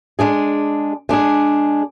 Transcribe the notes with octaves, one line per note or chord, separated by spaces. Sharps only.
G#3 D4 G#4
G#3 D4 G#4